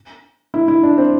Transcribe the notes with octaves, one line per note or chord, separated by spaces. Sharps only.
E4
E4
D4
C4